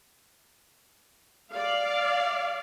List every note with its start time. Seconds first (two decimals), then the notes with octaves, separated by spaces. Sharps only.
1.51 D5 F5